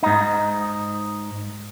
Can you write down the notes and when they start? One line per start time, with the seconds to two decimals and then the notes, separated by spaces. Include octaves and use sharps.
0.03 G#2 D#4